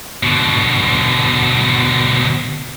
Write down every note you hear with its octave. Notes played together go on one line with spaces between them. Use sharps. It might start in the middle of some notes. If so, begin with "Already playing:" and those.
B2 D3